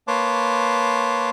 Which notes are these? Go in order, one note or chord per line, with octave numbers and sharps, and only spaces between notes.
A#3 B4 C#5 A5 C6 D6